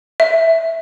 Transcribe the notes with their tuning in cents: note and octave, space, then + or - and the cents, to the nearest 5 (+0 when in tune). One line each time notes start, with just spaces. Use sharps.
E5 -5